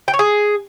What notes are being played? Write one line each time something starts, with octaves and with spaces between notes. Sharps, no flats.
G5
C#5
G#4